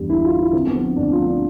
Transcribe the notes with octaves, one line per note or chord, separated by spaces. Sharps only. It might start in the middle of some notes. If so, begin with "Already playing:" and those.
Already playing: E2 G2 G3
G1 E4
F4
G3
E4
D3 C4
B3
F3 C4
D2 D4
F4
F3
D4